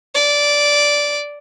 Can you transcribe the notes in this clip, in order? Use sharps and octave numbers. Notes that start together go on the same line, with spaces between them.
D5